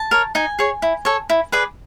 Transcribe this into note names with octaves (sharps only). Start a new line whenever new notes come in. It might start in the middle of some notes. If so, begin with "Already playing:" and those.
Already playing: A5
A#4 C#5
D#4 G#5
G#4 C#5
E4
A4 C#5
E4
G#4 B4 D5